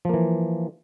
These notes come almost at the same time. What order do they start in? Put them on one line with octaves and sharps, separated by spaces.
F3 A#3 E3